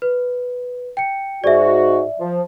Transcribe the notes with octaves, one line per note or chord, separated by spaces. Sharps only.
B4
G5 C#7
G#2 F#4 D5 E5
F3